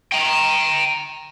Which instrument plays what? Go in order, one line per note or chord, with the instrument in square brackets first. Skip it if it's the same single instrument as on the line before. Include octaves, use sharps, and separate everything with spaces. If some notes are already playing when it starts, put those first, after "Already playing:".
[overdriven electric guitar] G5 A#5